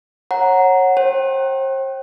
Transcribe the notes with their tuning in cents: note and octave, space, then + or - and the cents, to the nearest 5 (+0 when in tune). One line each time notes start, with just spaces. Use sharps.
C#5 -25 F#5 +0 A#5 +0
C5 +40 G5 -20